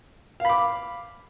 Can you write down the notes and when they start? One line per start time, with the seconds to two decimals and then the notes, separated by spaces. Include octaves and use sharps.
0.40 F5
0.45 B5
0.49 D6